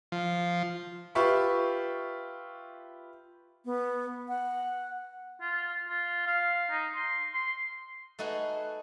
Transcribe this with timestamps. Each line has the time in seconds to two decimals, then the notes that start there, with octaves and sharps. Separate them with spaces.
0.12 F3
1.15 F4 G4 B4 E5 C#6
3.65 B3
4.28 F#5
5.41 F4
5.89 F4
6.26 F5
6.70 D#4
6.95 C6
7.34 C6
8.19 A3 D#4 F#4 G#4 B4